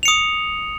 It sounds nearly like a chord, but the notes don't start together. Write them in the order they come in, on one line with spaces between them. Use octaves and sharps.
F7 C#7 D#6